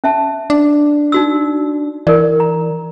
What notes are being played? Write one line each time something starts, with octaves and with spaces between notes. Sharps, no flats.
C#4 E5 A5
D4
D#4 F#4 E6
E3 A#4 D5
A#5